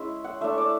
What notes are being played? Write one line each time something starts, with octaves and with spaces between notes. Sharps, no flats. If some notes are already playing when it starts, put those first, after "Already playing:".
Already playing: G#3 C#4 E4 E5
F#5
A3 D4 E5
D5